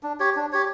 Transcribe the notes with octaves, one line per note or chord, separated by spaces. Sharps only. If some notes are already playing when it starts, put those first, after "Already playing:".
D4
G4 C#5
D4
G4 C#5